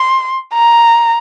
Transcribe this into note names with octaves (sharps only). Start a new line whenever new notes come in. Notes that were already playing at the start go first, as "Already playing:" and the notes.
Already playing: C6
A#5